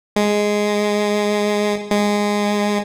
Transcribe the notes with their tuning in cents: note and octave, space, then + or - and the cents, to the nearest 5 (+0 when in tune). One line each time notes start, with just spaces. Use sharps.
G#3 +0
G#3 -10